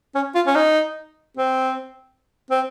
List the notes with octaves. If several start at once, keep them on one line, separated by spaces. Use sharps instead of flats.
C#4
F4
C#4
D#4
C4
C4